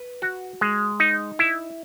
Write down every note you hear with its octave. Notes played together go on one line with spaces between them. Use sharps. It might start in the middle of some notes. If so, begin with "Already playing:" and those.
Already playing: B4
F#4
G#3
D#4
E4